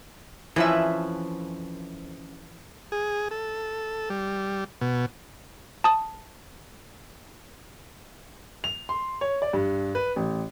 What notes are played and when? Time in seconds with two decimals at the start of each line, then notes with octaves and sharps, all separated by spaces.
0.56 F2 E3 F3 C#4 B4 E5
2.92 G#4
3.31 A4
4.10 G3
4.81 B2
5.84 A5 D#6
8.64 F7
8.89 C6
9.21 C#5
9.42 D5
9.53 G2
9.95 B4
10.16 A1